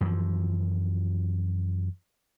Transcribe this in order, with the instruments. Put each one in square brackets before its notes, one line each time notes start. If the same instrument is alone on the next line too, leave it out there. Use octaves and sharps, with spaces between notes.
[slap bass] F#2 E3 F3